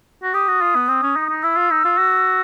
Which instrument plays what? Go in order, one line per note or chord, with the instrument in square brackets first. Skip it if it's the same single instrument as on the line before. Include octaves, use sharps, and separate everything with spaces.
[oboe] F#4
[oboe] G4 [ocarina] D#6
[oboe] F#4
F4
B3
C4
C#4
D#4
D#4
[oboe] E4 [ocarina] E6
[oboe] F4
D#4
F4
F#4